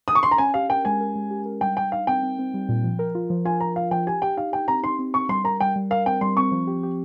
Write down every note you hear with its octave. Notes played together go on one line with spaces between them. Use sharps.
D#6
C#6
C6
A#5
C#4 G#5
G4 F5
A#4 G5
G#3 G#5
A#4
G#3
G4
A#4
G3 G5
G3 G5
D#4 F5
C4 G5
C4
C4
G3
A#2
F3
A#4
F4
F3
F4 G#5
F4 A#5
F4 F5
F3 G5
G4 G#5
G4 G5
D#4 F5
G4 G5
C4 A#5
D#4 C6
C4
C4 C#6
G3 C6
A#4 A#5
G3 G5
G3
A#4 F5
C4 G5
G3 C6
C4 C#6
F3
G4
G4